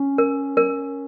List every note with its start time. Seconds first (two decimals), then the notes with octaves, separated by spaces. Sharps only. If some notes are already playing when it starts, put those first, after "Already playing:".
Already playing: C#4
0.18 A#4
0.57 A#4